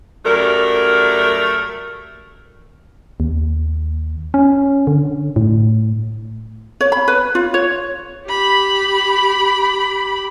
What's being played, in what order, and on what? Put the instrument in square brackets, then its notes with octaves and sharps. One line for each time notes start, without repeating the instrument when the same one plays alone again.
[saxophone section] F#2 G3 A3 A#4
[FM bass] D#2
C#4
D3
A2
[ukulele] C#5
B5
B4
F4
C#5
[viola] G4 B5